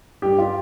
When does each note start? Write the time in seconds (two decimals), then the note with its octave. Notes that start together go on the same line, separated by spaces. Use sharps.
0.22 G2 G4
0.38 F4